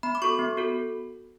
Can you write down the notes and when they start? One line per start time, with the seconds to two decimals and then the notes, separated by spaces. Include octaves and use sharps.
0.03 B3 B5
0.15 D6
0.22 F#4 A4 C#6
0.39 B3
0.57 F#4 A4